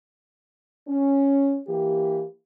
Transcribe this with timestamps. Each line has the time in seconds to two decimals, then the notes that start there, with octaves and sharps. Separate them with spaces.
0.87 C#4
1.68 E3 A#3 G4